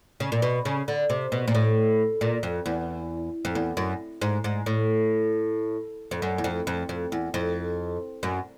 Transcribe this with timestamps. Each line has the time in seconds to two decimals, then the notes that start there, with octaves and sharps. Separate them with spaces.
0.20 C#3
0.32 A#2
0.42 B2
0.65 C#3
0.88 D3
1.10 C3
1.32 B2
1.48 A#2
1.55 A2
2.21 A#2
2.43 F2
2.66 E2
3.45 F2
3.55 E2
3.77 F#2
4.22 G#2
4.44 G#2
4.66 A2
6.11 F2
6.22 F#2
6.38 E2
6.44 F2
6.67 F2
6.89 F2
7.12 E2
7.34 F2
8.23 F#2